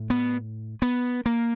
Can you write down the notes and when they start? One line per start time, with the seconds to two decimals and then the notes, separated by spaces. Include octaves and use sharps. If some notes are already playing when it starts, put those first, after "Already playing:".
Already playing: A2
0.10 B3
0.82 B3
1.26 A#3